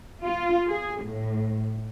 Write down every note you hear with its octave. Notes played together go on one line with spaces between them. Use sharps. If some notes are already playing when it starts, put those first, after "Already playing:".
F4
G#4
A2